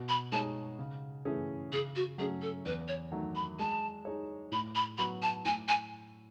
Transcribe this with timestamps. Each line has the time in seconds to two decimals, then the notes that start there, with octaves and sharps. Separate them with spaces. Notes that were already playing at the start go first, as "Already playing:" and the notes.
Already playing: B2
0.09 B5
0.32 G#3 D#4 G#4 C#5 A5
0.79 C#3
1.25 E3 A3 C#4 G#4
1.72 C#3 G#4
1.96 F#4
2.18 F#3 A3 C#4 G#4
2.42 A4
2.65 E2 B4
2.88 C#5
3.12 D#3 F#3 A3
3.36 B5
3.59 G#3 A5
4.05 D#4 G#4 C#5
4.52 A2 B5
4.75 B5
4.98 F#3 B3 F#4 B5
5.22 A5
5.45 A2 G#5
5.68 G#5